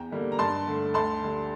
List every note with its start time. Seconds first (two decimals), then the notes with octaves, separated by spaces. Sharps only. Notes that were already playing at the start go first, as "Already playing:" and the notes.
Already playing: E2 G5 A#5
0.11 D3 G3 A#3
0.32 A#5
0.39 G2 A5 C6
0.67 D3 A3
0.94 D2 A5 C6
1.22 D3 G3